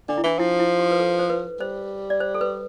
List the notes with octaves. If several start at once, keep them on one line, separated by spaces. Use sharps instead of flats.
D3 D4
E4
E3 D4
F3 E4
E4
G4
B4
A4
C5
B4
G3 C5
D5
C5
A4
B4